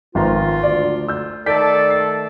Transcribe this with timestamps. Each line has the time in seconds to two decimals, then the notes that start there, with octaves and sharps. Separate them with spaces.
0.15 G#1 F3 B3 F4 A#5
0.63 D2 D5
1.08 E6 G6
1.46 D#3 A3 A4 D5 G6 B6
1.90 C7